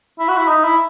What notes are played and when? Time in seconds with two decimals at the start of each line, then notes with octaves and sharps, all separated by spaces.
0.19 E4
0.28 F#4
0.37 E4
0.48 D#4
0.64 E4